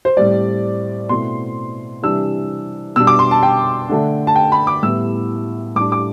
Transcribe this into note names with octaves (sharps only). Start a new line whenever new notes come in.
C5
A2 G3 C4 D5
B2 A3 C4 E4 C6
C3 E3 G3 D4 E6
B2 G3 D4 E6
D6
C6
A5
G5
D3 A3 D4
A5
G5
B5
D6
A2 G3 B3 E4 E6
A2 G3 D4 D6
D6